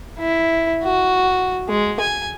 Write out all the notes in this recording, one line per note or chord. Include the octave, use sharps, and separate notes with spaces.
E4
F#4
G#3
G#5